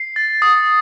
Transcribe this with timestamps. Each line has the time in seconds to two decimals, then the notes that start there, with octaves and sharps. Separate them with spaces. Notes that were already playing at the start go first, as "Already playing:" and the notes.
Already playing: C7
0.16 A6
0.42 D#6